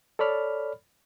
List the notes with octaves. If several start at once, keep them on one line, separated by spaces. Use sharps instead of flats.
A4 C#5 D5 B5 F6